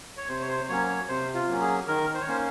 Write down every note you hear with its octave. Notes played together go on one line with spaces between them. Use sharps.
C#5
C3 C5
C#5
C5
F#3 A#3 C#4 C#5
C#5
C3 C5
F4
F#3 A#3 C#4
G#4
D#3 A#4
C5
C#5
A#3 C#4 C5